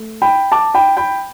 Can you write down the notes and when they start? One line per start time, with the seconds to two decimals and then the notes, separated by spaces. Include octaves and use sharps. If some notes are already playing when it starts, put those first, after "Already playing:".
Already playing: A3
0.22 G5 B5
0.52 A5 D6
0.74 G5 B5
0.97 G5 B5